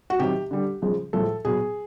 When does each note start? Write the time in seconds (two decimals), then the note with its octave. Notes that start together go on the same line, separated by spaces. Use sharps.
0.10 F#4
0.19 C3 D#3 F#3 G4
0.51 D3 G3
0.82 C#3 F3 G#3
1.13 A2 F3 G#3 A4
1.45 B2 F#3 G#4